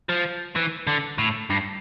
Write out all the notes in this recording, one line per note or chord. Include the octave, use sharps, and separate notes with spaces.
F3
E3
D3
A2
G2